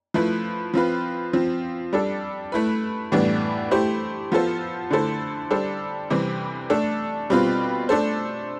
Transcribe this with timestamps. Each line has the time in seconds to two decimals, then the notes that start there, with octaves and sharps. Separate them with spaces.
0.14 F3 A3 E4 B4
0.74 F3 C4 F4 B4
1.33 F3 C4 F4
1.93 G3 D4 A4
2.52 A3 E4 B4
3.12 A2 E3 G3 B3 D4
3.71 A3 E4 G4 C5
4.32 F3 B3 F4 A4 C5
4.91 D3 A3 E4 A4 C5
5.51 G3 D4 A4 C5
6.10 C3 E3 G3 C4
6.70 A3 D4 A4
7.30 B2 G3 C4 F4 B4
7.89 A3 D4 A4 C5